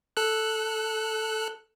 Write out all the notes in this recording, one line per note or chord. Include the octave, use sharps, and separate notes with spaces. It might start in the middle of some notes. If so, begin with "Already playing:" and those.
A4 F#6